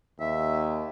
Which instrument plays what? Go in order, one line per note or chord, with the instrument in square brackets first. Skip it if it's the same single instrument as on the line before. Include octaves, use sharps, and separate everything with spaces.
[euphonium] D#2 [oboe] E5